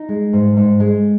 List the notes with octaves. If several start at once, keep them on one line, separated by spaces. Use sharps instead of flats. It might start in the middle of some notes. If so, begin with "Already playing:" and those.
Already playing: D#4
G#3
G#2
G#2
G#3